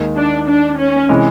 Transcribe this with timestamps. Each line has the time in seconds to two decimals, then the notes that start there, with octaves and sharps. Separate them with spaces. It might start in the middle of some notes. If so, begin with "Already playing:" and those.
Already playing: D#2 D#3 G#3
0.17 D4
0.48 D4
0.78 C#4
1.09 C3 E3 G#3